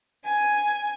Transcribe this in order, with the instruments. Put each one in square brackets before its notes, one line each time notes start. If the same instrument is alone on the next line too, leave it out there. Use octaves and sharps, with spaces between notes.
[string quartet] G#5